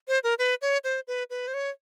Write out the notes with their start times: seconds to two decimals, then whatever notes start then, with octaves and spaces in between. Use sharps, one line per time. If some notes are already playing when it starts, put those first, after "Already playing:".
0.08 C5
0.24 A#4
0.39 B4
0.62 C#5
0.84 C5
1.08 B4
1.30 B4
1.48 C5
1.54 C#5